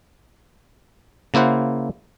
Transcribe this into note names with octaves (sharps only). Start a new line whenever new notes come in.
C#3 A#3 E4 C5 F#5